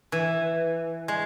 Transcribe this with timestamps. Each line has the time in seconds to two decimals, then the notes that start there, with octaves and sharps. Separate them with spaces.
0.12 E3
1.08 G#3